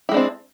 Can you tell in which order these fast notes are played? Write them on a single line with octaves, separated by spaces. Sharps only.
E4 G#3 D4 C4